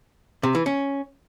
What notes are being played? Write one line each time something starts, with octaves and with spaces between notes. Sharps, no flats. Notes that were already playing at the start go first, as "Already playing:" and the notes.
C3
E3
C#4